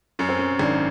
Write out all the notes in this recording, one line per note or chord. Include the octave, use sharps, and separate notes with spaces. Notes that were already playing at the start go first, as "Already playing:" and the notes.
F#2 C#4
C4
C#4
G#1 D4